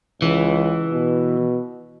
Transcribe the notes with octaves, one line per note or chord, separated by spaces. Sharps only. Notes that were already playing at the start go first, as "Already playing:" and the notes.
C#2 E3
B2